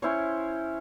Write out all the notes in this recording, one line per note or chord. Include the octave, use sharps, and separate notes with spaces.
C#4 E4 C5 C#5